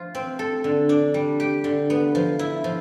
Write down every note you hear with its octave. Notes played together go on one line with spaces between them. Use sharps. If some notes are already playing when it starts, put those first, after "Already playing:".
Already playing: F3 F4
C4
A4
D3
D4
G3
G4
D3
B3
F3
E4
F3